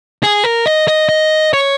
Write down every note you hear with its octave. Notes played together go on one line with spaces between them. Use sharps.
G#4
A#4
D#5
D#5
D#5
C#5